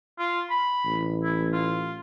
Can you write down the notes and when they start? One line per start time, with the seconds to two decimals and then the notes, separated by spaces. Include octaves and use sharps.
0.18 F4
0.50 B5
0.85 A1
1.23 E4
1.53 F4